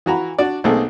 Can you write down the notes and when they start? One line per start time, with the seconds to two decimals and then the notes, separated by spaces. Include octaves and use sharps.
0.06 E3 F#4 A#5 B5
0.38 D4 F#4 D5
0.64 B1 A3 A#3 C4 G#4 A4